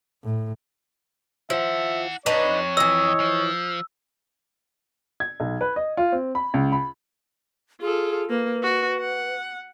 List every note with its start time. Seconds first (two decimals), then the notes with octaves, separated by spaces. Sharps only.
0.24 A2
1.50 F3 E4 E5 F#5
2.26 F2 D4 D#4 B4 C#5
2.77 E3 D#5 E6
3.20 F3
5.20 G#6
5.40 B1
5.61 B4
5.76 D#5
5.97 F4
6.12 C4
6.35 B5
6.54 C#2
6.72 B5
7.81 F4 G#4 A4
8.30 A#3 B4
8.63 F#4
9.00 F#5